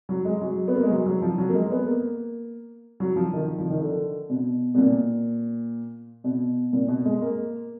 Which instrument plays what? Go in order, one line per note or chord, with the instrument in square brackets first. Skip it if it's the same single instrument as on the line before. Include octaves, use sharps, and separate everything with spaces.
[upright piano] F#3
G#3
F#3
B3
A#3
G#3
F#3
F#3
F3
F#3
A#3
G#3
B3
A#3
F#3
F3
D#3
F3
D#3
D3
B2
B2
A#2
B2
A#2
B2
G#3
A#3